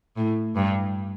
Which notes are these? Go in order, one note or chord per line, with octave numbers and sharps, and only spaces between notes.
A2
G2